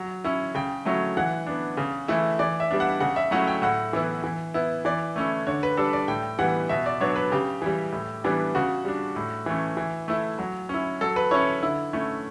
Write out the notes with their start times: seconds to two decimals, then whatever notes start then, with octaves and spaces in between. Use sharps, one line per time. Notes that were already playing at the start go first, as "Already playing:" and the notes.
Already playing: F#3
0.24 C#4 E4
0.55 C#3 G5
0.85 F#3 A3 C#4 E4
1.17 E3 F#5
1.47 B3 D4
1.77 C#3
2.08 E3 A3 E4
2.39 E3 D5
2.60 E5
2.71 G3 B3 D4
2.80 F#5
3.00 C#3 F#5
3.16 E5
3.31 F#3 A3 C#4 E4 F#5
3.47 G5
3.62 A2 F#5
3.93 E3 B3 E4
4.24 E3
4.54 B3 E4
4.85 E3 D5
5.16 A3 C#4 E4
5.47 D3 C#5
5.63 B4
5.77 G3 D4 A4
5.93 D5
6.08 A2 G5
6.39 E3 G3 B3 F#5
6.69 B2 E5
6.86 D5
7.01 F#3 B3 D4 C#5
7.16 B4
7.32 C#3 G4
7.62 E3 G3
7.92 A2
8.24 E3 G3 B3 D4
8.55 C#3 F#4
8.85 G3 D4
9.16 A2
9.46 E3 A3 C#4
9.77 E3
10.08 A3 E4
10.39 F#3
10.69 C#4 E4
11.01 F#3 A4
11.16 B4
11.31 C#4 E4 C#5
11.63 D3 E4
11.93 A3 C#4 E4